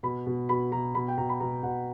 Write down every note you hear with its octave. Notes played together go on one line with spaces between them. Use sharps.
B2 B5
B2
B2 B5
B2 A#5
B2 B5
G5
B2 A#5
B5
B2 A#5
B2 F#5